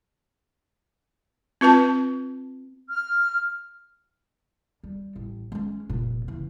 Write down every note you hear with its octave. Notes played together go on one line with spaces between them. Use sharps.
C4 F4 B4 A5
F6
G3
A1
G#3 C#4
F1 A#2
C#2 E3